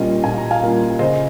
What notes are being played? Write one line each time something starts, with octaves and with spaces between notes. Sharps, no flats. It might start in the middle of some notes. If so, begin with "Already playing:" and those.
Already playing: A#2 G3 A#3 C#4 F4 D#5
A#2 G#5
A#5
F5 G#5
G3 A#3 C#4 F4
C#3 C5 D#5